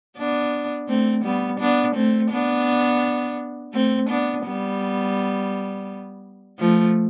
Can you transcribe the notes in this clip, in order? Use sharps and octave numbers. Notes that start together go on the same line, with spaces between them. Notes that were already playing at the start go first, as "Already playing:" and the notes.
B3 D4
A3 C4
G3 B3
B3 D4
A3 C4
B3 D4
A3 C4
B3 D4
G3 B3
F3 A3